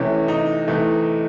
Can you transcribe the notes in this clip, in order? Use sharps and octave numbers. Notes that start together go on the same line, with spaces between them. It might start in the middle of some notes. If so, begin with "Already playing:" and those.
Already playing: C3 E3 A3 C#4
D#4
C3 E3 A3